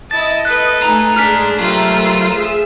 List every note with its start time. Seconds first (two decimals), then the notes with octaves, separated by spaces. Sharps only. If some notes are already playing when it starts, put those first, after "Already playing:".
0.11 E4 D#5 A5 A6
0.45 A4 B4 F#6 B6
0.82 G#2 A3 D#4 G#5 A#5
1.16 D4 G#4 F6 B6
1.59 F#3 A3 F4 G4 A#4 C5 E5
2.32 G#4 E5 E7